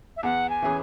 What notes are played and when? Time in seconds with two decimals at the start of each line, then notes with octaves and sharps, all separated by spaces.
0.17 E5
0.23 E2 F#5
0.50 G#5
0.62 E3 C#4 G#4 B4